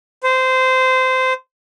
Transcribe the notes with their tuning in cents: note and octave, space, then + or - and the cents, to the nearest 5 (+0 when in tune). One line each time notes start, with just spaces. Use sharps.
C5 -20